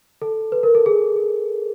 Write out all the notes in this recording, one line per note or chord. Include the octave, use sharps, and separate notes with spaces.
A4
B4
A#4
A4
G#4